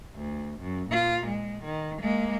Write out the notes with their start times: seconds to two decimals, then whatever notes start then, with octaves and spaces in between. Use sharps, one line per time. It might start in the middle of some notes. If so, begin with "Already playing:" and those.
0.15 D2
0.61 F#2
0.90 A#2 F4
1.27 G#3
1.64 D#3
2.02 G#3 A#3